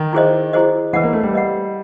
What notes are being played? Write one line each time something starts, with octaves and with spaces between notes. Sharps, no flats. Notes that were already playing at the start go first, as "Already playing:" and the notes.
Already playing: D#3
E4 G#4 C5 D#5
E4 G#4 C5 D#5
E3 B4 D#5 F#5
A#3
A3
G3
B4 D#5 F#5